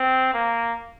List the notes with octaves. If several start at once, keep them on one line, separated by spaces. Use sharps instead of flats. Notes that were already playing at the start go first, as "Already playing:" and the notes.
Already playing: C4
A#3